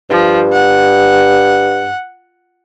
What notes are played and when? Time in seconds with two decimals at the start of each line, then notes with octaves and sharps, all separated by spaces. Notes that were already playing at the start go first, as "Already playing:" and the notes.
0.10 G2 F3
0.53 F#5